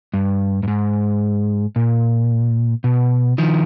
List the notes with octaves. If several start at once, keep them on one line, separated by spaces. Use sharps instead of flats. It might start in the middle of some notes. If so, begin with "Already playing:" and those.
G2
G2
G#2
A#2
B2
D#3 F3